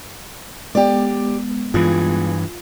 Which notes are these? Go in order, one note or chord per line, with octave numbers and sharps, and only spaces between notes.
G#3 B3 G4 D5
G2 E3 F4 G#4